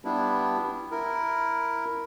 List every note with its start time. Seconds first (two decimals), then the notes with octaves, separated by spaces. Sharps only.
0.05 G3 B3 D4 E4
0.91 E4 A#4